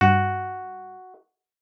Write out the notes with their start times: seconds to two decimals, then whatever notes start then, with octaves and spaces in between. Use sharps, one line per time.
0.01 G2 F#4